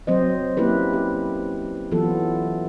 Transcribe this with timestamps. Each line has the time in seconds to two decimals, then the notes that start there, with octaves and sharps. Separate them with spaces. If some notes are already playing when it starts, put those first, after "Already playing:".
0.07 F#3 C4 C5 D#5
0.57 A#3 C#4 E4 G4 B4
0.93 G4
1.92 E3 F#3 B3 F4 A4